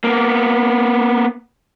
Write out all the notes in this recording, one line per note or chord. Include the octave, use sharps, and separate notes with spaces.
A#3 B3